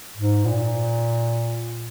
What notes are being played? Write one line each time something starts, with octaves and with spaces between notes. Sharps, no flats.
G#2
A#2